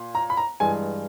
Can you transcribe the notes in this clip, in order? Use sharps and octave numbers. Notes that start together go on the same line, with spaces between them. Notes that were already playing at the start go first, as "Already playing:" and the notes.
Already playing: A#2
A#5
B5
A#5
G2 E3 G#3 G#5